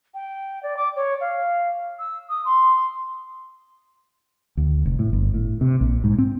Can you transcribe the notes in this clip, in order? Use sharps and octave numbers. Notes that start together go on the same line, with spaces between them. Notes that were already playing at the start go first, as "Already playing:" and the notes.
G5
D5
D6
C#5
F5
E6
D#6
C6
D2
F1
A2
G1
A2
C3
A#1
G#2
C4